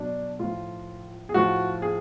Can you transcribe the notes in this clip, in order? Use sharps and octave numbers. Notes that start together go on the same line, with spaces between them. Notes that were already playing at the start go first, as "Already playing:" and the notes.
Already playing: B2 F#3 D4
A2 F3 F4
G#4
A2 F3 F#4
G#4